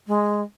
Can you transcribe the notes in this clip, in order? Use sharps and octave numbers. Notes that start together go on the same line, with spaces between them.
G#3